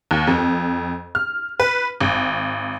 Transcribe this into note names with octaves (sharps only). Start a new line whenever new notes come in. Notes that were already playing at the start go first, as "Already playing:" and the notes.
D#2
F2
F6
B4
G#1